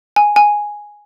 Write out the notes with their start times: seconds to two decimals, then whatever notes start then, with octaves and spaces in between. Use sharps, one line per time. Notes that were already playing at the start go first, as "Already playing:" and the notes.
0.16 G#5
0.36 G#5